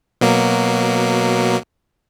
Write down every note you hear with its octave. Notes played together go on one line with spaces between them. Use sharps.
B2 F#3 A#3